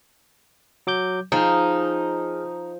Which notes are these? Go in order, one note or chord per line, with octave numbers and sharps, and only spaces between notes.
F#3 D6 G6
F3 D#4 G#4 F6